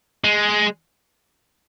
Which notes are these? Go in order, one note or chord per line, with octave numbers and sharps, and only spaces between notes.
G#3